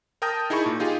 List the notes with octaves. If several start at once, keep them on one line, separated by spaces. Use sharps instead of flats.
A#4 G5 A5 D#6 G6 A#6
D#4 E4 G#4 A5 B5 C#6
A#2
D#4 F4 G4 G#4